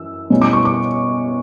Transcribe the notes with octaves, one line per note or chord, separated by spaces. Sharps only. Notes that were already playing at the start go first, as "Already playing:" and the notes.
Already playing: F#2 E3 E6
B2 G3 C#4 E4
D6
C#6
D6